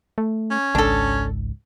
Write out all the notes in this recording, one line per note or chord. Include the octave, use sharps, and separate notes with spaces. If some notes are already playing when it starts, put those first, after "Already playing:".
A3
C#4
G#1 C#2 G#2 D4 A4